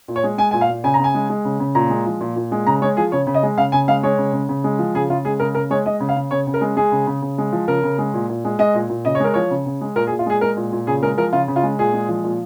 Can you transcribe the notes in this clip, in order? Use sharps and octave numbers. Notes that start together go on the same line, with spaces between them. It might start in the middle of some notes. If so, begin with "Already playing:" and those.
A#2
C#5
G#3
G#3 G#5
A#2 G#5
F5
A#2
C#3 G#5
A#5
C#3 G#5
G#3
G#3
C#3
C#3
A#2 A#5
G#3
F3
A#2
A#2
G#3
C#3 A#5
G#3 C#5
F3 G#4
C#3 C#5
C#3
D#5
G#3
C#3 F5
C#3 G#5
G#3 F5
G#3 C#5
C#3
C#3
C#3
G#3
F3
C#3 G#4
C#3 F4
G#3 G#4
C#3 A#4
C#3 A#4
G#3 C#5
G#3 D#5
C#3
F5
C#3
C#3 C#5
C#3
A#4
G#3
G#3 G#4
C#3
C#3
C#3
G#3
F3
C#3 A#4
C#3
G#3
A#2
A#2
G#3
G#3 D#5
A#2
A#2
C#3 D#5
C#5
G#3 A#4
F3 C#5
C#3
C#3
G#3
A#2 A#4
G#4
A#2
F4
G#3 G#4
G#3 A#4
A#2
A#2
C#3 G#4
G#3 A#4
F3 A#4
C#3 F4
C#3
F4
G#3
A#2 G#4
G#3
F3
A#2